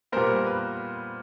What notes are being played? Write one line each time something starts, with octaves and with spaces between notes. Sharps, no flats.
A#2 G3 B3 A#4 C5
B4